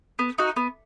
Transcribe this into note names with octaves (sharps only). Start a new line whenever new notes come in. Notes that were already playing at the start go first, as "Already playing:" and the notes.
B3
D#4 F#4
B3